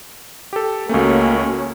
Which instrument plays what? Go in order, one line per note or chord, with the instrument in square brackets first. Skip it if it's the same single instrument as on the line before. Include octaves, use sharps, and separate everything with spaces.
[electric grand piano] G4 A4
[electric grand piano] C#2 A3 [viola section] A#3 C#4 F#4